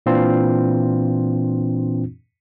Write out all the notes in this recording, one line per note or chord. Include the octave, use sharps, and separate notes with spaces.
A#2 E3 C4 D4 F4